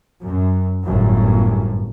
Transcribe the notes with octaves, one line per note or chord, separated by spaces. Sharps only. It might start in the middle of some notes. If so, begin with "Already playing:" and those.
F#2
G1 F#2 A2